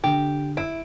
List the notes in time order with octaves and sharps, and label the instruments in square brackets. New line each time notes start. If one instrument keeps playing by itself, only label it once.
[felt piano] D3 [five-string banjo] G4
[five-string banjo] E4 [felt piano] D7